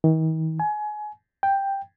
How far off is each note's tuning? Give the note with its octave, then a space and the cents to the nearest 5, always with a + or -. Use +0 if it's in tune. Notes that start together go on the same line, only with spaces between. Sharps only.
D#3 +40
G#5 +25
G5 +5